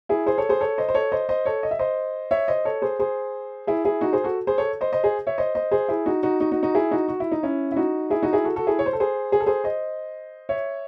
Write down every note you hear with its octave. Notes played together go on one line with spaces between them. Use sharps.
E4 G#4
G#4 C5
A4 C#5
G#4 C5
A4 C#5
C5 D#5
C5
A4 C#5
C5 D#5
C5 D#5
A4 C#5
D#5
E5
C5 D#5
C#5 E5
C5 D#5
A4 C#5
G#4 C5
G#4 C5
E4 G#4
E4 G#4
D#4 F#4
G#4 C5
F#4 A4
G#4 C5
A4 C#5
C5 D#5
C5 D#5
G#4 C5
C#5 E5
C5 D#5
C5 D#5
G#4 C5
E4 G#4
D#4 F#4
D#4 F#4
D#4 F#4
D#4 F#4
D#4 F#4
E4 G#4
D#4 F#4
F#4
E4
D#4
C#4 E4
E4
D#4 F#4
E4 G#4
D#4 F#4
E4 G#4
F#4 A4
F#4 A4
E4 G#4
C#5
C5
A4
G#4 C5
G#4
A4
G#4 C5
C5 D#5
C#5 E5